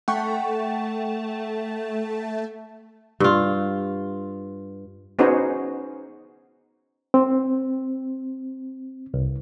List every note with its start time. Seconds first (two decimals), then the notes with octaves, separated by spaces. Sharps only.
0.08 A3 F#5 G5 C#6
3.20 G2 F4
5.19 B3 C#4 D#4 F#4 G#4 C5
7.14 C4
9.14 C2